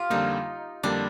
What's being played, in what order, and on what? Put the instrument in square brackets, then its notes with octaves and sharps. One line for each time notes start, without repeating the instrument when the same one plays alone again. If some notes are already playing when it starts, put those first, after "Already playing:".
Already playing: [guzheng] F4 G4
[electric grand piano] F2 D3 G3 A#3 [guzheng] D#4
[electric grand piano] F2 D3 G3 A#3 [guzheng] D4